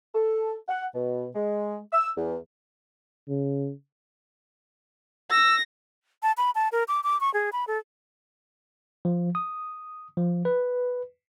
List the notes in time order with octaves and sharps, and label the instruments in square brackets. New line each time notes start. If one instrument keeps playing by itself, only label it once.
[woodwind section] A4
F#5
B2
G#3
E6
E2
[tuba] C#3
[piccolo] E6 [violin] A#6
[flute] A5
B5
A5
A#4
D6
D6
C#6
G#4
B5
A4
[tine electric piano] F3
D#6
F3
B4